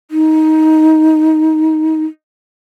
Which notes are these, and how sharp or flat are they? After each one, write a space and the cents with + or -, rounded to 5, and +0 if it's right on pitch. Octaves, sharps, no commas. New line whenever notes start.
D#4 +15